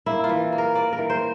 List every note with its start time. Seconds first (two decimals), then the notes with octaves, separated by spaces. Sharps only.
0.06 A#3 E4
0.24 F4
0.29 E3
0.52 A#3
0.58 A#4
0.75 A#3 D5
0.93 A#4
0.98 E3
1.10 C5